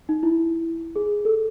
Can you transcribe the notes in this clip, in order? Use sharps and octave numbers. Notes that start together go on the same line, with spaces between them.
D#4
E4
G#4
A4